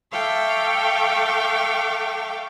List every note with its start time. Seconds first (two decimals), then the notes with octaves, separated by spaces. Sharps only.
0.12 A4 E5 F5 G5 C#6 D6